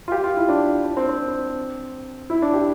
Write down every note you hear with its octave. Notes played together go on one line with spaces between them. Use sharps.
F4
G4
F4
E4
D4
D4
C4
C4
E4
D4
G4